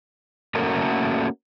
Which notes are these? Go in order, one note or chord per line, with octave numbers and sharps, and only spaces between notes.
A3 A#3 C#4 F#4 A4 A#4